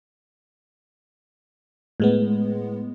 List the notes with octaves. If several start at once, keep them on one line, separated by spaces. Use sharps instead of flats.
A2 G#3 B3